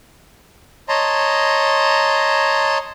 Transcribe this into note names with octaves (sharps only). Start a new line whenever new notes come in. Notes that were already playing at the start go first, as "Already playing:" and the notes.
C#5 D#5 A5 A#5 C6